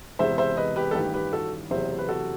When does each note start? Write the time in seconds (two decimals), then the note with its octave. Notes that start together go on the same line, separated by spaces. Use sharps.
0.19 E1 E2 C3 C5 E5
0.38 C5 E5
0.57 B4 D#5
0.76 G4 B4
0.91 A4
0.95 A1 G2 D#3 G4 B4
1.14 G4 B4
1.33 F#4 A4
1.71 F#1 E2 C3 F#3 C5 E5
1.99 B4
2.09 F#4 A4